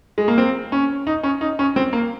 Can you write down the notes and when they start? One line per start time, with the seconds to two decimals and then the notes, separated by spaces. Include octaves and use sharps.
0.18 G#3
0.28 A#3
0.38 C4
0.72 C#4
1.07 D#4
1.23 C#4
1.41 D#4
1.59 C#4
1.76 C4
1.93 A#3